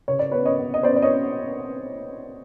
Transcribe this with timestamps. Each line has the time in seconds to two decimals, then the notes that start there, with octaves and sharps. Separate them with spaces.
0.08 C#3 C#5
0.19 D5
0.32 B3 B4 C#5
0.45 C#5 D#5
0.59 B3
0.74 D#5
0.83 B3 C5 D5
0.96 D5
1.02 C#5 D#5